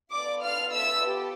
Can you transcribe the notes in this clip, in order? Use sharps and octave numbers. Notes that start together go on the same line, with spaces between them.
B3 F4 A4 D5 D6
F5 F6
E5 E6
G4